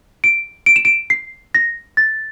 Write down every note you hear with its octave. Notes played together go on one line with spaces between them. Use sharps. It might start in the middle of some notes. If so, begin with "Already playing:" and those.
D7
D7
E7
D7
C7
A#6
A6